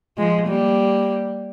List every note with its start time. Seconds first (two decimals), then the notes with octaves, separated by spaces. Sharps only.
0.18 F3 G#3
0.47 G3 A#3